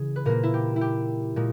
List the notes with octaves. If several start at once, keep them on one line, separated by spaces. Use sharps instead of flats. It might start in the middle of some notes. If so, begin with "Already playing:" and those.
Already playing: C#3 E3 G#4
B4
A#2 A#3 A#4
E4
G4
E4
G4
A#2 G#3